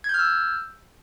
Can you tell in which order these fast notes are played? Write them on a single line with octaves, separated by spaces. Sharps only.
G#6 G6 F6 E6